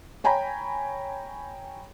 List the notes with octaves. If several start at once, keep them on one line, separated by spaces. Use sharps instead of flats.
C#5 G5 G#5 A#5 B5